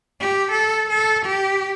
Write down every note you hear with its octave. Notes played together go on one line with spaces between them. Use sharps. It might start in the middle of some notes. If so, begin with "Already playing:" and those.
G4
A4
A4
G4